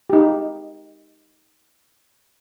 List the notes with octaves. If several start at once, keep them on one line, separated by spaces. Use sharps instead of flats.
D#4 G4